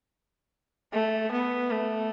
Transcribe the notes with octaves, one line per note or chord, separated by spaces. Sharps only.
A3
B3
A3